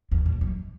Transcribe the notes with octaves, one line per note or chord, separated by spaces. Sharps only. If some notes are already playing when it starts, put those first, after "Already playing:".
E2
A#2
F#2